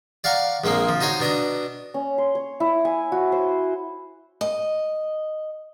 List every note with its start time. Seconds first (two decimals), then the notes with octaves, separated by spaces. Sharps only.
0.24 D5 F5 F#5 A#5 C#6
0.64 A#1 G#3 A#3 C4
0.89 F3
1.01 D#4 F#4 C5 C#5 D#5
1.20 B2 D4 D#5 A#5
1.94 C#4
2.18 C6
2.35 C#5
2.60 E4
2.85 G#5
3.12 F#4
3.32 C5
4.41 D#5